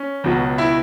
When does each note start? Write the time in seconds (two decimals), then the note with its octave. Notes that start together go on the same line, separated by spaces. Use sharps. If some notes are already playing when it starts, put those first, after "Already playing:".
Already playing: C#4
0.24 C#2 B2 F#3
0.58 E4